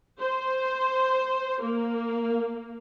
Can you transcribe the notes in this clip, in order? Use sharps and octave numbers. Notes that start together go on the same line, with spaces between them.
C5
A#3